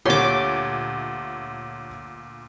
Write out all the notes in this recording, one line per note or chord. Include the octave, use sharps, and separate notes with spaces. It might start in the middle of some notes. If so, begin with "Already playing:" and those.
D2 A#2 G4 C#5 C6 D6